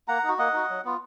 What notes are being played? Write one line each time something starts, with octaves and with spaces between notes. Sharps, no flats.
A#3 F#5 A#5
D#4
F#4
A#3 D#5 F#5
D#4 F#4
F#3
B3 F4